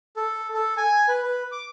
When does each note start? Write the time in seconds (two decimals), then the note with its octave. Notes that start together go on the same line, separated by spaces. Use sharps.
0.17 A4
0.54 A4
0.77 G#5
1.08 B4
1.23 B4
1.52 D6